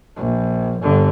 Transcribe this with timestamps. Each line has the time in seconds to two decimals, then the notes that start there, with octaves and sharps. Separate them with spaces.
0.17 A#1
0.80 G1 D3